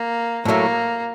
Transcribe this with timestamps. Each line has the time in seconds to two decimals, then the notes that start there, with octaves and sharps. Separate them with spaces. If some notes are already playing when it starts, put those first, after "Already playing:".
Already playing: A#3
0.45 A2 F#3 A3 A#3